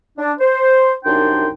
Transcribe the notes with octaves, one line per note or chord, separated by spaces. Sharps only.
D4
C5
C2 F#2 D4 D#4 G5 C6